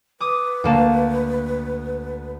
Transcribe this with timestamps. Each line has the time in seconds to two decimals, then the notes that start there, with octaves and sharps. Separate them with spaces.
0.20 B4 D6 D#6
0.64 D2 A#3 A5